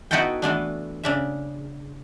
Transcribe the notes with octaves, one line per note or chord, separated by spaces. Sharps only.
B3 D#4 E4 F#4 A4 G5
E3 A3 B3 D4
C#3 D4 E5